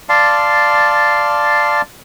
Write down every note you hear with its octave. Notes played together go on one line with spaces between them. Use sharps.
D5 F5 A5 C6